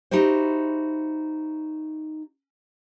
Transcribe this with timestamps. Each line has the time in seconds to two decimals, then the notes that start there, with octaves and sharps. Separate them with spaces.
0.11 D#4 E4 F#4 G4 C5